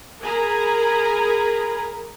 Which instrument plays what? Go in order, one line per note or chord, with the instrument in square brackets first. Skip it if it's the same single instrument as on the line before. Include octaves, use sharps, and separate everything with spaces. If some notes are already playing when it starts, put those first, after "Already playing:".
[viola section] G#4 A#4 G#5 A#5 B5